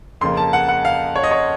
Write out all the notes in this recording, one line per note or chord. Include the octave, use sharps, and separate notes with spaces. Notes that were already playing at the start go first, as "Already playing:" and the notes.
F2 C#3 F3 A#3 C6
A5
F#5
F#5
F5
C#5
D#5
C#5